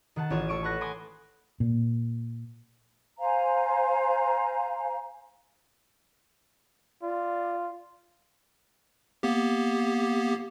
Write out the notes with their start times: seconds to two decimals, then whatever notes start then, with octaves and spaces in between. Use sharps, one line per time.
0.16 D#3 F#5 A5
0.30 A1 F4 C#5 D#7 E7
0.48 A3 C#6 D7 D#7
0.64 B4 F#5 A5 F#6 A#6
0.81 G#5 B5 C6 D6 D#6
1.60 A#2
3.20 C5 F5 G#5 A#5
7.02 F4 D5
9.23 A#3 B3 G4